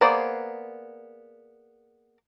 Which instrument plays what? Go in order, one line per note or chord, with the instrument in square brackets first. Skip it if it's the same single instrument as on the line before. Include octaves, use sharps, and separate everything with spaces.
[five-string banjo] A#3 B3 G#4 C5 D5